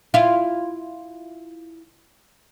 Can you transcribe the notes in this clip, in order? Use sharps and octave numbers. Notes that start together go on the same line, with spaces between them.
E4 F4